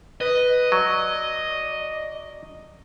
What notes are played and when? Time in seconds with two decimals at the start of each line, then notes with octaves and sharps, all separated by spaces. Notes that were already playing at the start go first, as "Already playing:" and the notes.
0.21 B4 D#5
0.72 F#3 D5